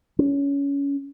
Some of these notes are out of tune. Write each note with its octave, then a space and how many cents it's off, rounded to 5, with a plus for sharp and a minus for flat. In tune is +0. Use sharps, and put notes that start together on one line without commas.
C#4 +20